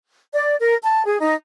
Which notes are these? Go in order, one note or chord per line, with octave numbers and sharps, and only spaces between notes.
D5
A#4
A5
G#4
D#4